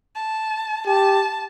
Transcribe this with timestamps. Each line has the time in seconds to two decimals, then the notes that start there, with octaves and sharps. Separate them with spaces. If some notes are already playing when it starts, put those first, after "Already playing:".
0.15 A5
0.86 G4 A5